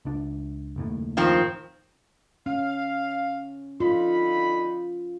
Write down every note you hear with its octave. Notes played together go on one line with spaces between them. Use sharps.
C#2 D4
F#1 D#2 A2
D#3 F3 C4
C#4 F5
D3 D#4 F4 B5